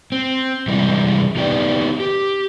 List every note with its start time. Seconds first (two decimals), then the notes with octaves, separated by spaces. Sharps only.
0.12 C4
0.68 C3 E3 G3 G#3
1.36 B3 D#4 G4 B4 D5 G5
2.00 G4